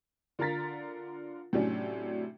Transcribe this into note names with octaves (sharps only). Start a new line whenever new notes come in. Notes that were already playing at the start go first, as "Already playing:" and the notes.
D3 F4 A#4 A#5 A6 B6
A2 C3 F#3 C#4 D4